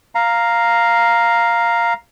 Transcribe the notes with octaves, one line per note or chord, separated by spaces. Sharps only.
F5 A#5